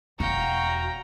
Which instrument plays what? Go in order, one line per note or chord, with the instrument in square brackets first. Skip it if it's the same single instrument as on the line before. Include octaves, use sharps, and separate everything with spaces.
[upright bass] E1 [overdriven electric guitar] F#4 [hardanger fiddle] F5 G5 [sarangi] A#5